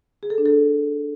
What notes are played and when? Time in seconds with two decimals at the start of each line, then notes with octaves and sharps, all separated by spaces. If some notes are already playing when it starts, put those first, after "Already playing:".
0.23 G#4
0.30 A4
0.38 D4
0.46 A4